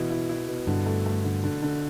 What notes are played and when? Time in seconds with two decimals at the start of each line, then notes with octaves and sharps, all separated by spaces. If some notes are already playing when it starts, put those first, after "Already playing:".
Already playing: B2 E3 E4
0.10 E4
0.29 E4
0.48 B2
0.67 G2 D3
0.86 A3
1.06 A3
1.24 D3
1.44 D3
1.63 D3